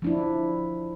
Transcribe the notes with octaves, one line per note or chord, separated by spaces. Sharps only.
F3 D4 E4